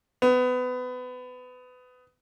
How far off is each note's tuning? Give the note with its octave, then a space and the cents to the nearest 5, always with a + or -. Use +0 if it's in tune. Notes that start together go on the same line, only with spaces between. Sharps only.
B3 +25